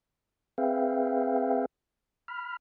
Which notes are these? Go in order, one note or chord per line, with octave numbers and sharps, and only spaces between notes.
C4 G#4 B4 E5 F5 G5
B5 F6